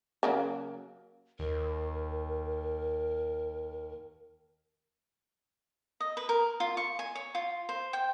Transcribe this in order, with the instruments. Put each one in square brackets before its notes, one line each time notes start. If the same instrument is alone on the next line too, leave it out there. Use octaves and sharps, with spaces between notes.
[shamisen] C#3 F#3 A#3
[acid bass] D#2 [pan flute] A#4
[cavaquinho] D#5
B4
A#4
F4
C#6
G#5
C#5
F4
C5
G5